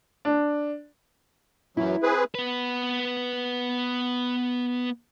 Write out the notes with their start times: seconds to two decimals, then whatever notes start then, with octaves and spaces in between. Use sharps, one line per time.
0.25 D4
1.77 F#2 E3 F#3 E4
2.03 C4 G#4 B4
2.35 B3 B4